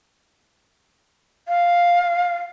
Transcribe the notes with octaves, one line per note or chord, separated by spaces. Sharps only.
F5